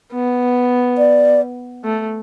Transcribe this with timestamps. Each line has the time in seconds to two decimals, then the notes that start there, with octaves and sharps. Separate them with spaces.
0.12 B3
0.98 D5
1.84 A3